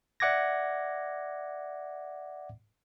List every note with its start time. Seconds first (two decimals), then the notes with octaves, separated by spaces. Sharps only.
0.20 D5 E5 F#5 D6 G#6 A#6